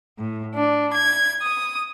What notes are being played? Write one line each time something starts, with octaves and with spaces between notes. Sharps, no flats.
A2
D4
G#6
D#6